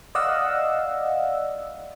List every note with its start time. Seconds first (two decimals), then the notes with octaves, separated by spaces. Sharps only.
0.15 D5 D#5 F5 F#5 E6